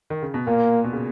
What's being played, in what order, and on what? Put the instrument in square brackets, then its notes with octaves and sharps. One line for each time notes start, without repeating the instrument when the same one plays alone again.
[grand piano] D#3
C#3
B2
[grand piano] A#2 [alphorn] A#3
[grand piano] B2
C#3